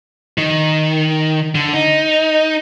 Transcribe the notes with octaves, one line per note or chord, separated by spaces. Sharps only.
D#3
D3
D#4